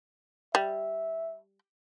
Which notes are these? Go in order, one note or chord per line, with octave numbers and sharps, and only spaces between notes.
G3 E5